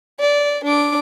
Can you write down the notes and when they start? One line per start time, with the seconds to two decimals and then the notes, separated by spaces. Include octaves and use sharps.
0.19 D5
0.63 D4 D6